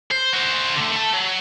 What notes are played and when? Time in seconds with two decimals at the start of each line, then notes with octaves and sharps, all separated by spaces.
0.11 C5
0.33 F#4 C5
0.76 D3 A3
0.92 A3 A5
1.14 F#3